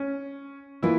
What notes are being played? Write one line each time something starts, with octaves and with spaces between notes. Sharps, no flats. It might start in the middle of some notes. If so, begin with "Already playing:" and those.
Already playing: C#4
E3 A#3 E4 F4